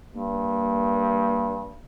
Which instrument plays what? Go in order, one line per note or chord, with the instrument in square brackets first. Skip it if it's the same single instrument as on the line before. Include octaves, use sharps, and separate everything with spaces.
[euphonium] G2 [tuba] A#3